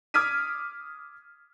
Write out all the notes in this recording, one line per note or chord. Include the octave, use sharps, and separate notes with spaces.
D6 D#6 F6 G#6 B6 D#7